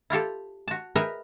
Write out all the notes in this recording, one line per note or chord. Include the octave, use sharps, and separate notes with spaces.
E4 F4 G4 A4
F#4 A5
G#4 A#4 B4 D#5 E5 G5